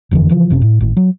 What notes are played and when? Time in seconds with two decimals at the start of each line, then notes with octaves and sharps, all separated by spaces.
0.11 F#1 F2 D3 E3
0.29 C#3 E3 F3
0.50 F#1 C3 C4 C#4
0.61 A2
0.81 G#1 A2
0.97 F#3